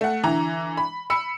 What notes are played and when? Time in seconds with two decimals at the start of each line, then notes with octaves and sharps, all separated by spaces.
0.01 A3 F#5
0.23 D3 E3 A#5
0.77 B5
1.10 B5 E6 C#7